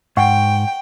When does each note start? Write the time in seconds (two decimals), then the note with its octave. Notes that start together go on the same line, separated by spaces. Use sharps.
0.17 G#2 F#5 G5 C#6